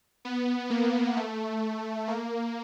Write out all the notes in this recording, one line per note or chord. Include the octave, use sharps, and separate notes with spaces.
B3
A#3
A3
A#3